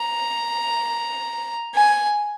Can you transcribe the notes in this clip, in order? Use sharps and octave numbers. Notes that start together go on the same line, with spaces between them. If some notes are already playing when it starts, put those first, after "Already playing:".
Already playing: A#5
G#5